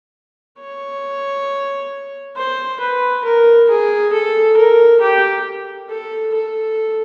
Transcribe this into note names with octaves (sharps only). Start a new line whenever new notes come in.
C#5
C5
B4
A#4
G#4
A4
A#4
G4
A4
A4